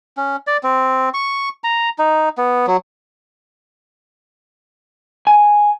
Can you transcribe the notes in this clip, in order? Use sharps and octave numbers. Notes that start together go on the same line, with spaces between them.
C#4
D5
C4
C#6
A#5
D#4
B3
F#3
G#5